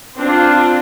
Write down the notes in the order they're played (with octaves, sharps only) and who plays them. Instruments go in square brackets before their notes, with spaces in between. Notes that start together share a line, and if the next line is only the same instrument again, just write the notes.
[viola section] C4 D4 F4